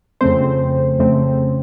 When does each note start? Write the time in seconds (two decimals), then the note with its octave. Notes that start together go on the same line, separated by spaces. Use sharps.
0.21 F2 C#3 A3 C4 C5
0.99 F2 C#3 A3 C4